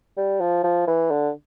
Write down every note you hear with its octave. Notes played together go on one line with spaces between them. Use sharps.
G3
F3
F3
E3
D3